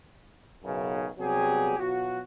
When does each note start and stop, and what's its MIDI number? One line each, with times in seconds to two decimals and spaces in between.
0.65 1.08 35
0.65 1.08 42
0.65 1.08 49
1.19 1.75 48
1.19 1.75 54
1.19 1.75 55
1.19 1.75 59
1.19 1.75 67
1.19 1.75 68
1.79 2.20 47
1.79 2.20 54
1.79 2.20 65
1.79 2.20 66